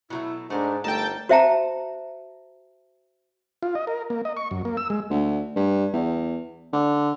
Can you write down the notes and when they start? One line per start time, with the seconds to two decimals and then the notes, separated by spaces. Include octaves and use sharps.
0.10 B2 F#3 A3 E4
0.50 G#2 A3 A#3 D4 A#4
0.84 G1 G3 A3 D#4 A#4 G5 A5
1.29 F#4 C5 E5 G5 A5 A#5
3.63 F4
3.75 D#5
3.87 A#4
4.10 A#3
4.25 D#5
4.37 C#6
4.51 F#2
4.65 A#3
4.77 E6
4.90 G#3
5.10 D2
5.56 G2
5.93 E2
6.73 D3